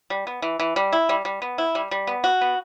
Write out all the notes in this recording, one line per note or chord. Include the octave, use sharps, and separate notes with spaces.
G3
B3
E3
E3
G3
E4
G3
G3
B3
E4
G3
G3
B3
F#4
B3